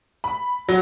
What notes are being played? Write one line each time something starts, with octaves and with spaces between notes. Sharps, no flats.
B5
F#3